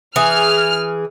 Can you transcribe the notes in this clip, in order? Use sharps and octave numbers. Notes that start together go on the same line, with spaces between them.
E3 G#4 F6